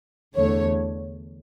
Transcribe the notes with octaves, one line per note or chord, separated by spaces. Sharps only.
E2 D3 A3 C#5